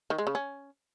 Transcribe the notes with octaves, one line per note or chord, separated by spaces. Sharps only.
D#3
G#3
C#3
C#4